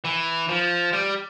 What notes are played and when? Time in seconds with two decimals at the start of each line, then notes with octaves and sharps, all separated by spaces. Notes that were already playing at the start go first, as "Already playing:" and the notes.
0.04 E3
0.49 F3
0.93 G3